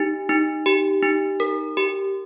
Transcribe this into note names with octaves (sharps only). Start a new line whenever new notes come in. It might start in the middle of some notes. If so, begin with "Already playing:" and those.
Already playing: D#4 G4
D#4
G4
D#4
A#4
G4